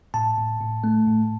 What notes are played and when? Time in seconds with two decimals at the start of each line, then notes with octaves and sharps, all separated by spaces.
0.14 A2 A5
0.38 A2
0.61 A2
0.84 A3
1.07 A2